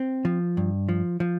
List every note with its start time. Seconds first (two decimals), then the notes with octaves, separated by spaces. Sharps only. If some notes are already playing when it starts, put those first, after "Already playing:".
Already playing: C4
0.25 F3
0.57 G2
0.89 F3
1.20 F3